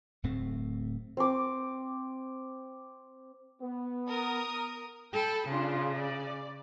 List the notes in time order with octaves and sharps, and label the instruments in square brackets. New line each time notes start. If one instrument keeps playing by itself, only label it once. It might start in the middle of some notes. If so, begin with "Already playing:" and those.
[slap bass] D1 A2 A3 C4
[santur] C4 D6
[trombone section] B3
[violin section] A#4 D#6
[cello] A4 [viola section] G5 B5
[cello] C#3 [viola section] D4 F4
[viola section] D5